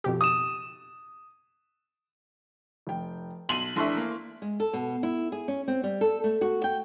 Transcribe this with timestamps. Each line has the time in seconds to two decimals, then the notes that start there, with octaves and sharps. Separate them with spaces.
0.04 F2 B2 G4
0.21 D#6 E7
2.87 F1 G5
3.49 B1 C6 D#7 F#7
3.76 F1 E3 D4 E5 C6 C#6
3.97 A#3
4.42 G#3
4.60 A4
4.73 B2
5.03 E4
5.32 G#4
5.48 C#4
5.68 C4
5.84 G3
6.01 A4
6.24 A3
6.41 F#4
6.64 G5